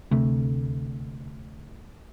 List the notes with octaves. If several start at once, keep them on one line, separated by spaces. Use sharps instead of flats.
D2 C3 A3